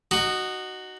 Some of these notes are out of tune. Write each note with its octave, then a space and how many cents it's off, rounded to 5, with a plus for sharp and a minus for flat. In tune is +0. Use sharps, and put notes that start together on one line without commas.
D#4 -20 F#4 +10